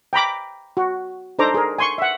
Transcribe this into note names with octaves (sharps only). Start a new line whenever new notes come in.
G5 A#5 B5 D6
F#4
D4 D#4 A4 C5 A#5 D6
G#4 A#4
G#5 C6 C#6
E5 F#5